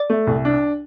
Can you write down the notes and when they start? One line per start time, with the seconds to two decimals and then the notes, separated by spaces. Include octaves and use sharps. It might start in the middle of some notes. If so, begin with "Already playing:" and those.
Already playing: D5
0.10 A3
0.27 C2
0.45 D4